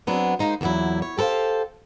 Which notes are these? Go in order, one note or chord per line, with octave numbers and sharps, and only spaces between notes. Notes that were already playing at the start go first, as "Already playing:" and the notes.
F#3 B3 C4 D4 G#4
G#3 A#3 D#4 C5
E2 A#2 D#3 F#3 E4
C#5
G4 A4 A#4 C5 F5